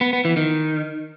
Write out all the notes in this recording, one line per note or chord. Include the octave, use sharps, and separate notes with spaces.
B3
B3
E3
D#3